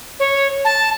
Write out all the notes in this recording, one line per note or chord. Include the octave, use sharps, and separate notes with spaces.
C#5
A5